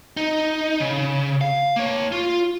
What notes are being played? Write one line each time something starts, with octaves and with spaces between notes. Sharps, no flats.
D#4
C#3
F5
A#3 C#5
F4